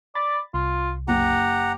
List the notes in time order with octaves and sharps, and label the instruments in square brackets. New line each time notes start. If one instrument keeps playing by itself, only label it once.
[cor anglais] D5 [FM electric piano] B5 A6
[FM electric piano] C2 [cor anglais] F4
[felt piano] F#1 [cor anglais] G4 [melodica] F#5 A#5